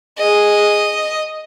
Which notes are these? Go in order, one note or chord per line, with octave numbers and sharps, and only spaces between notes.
G#4 D#5